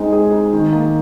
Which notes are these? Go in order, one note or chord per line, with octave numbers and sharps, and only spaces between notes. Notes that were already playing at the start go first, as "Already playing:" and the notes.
Already playing: G#3 C4 D#4
G#4
D#4
D#3
A#3